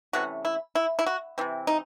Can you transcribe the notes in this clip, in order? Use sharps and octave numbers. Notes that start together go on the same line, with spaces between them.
C3 E3 A3 C#4 F#4
E4
E4
E4
F#4
C3 E3 C4
D#4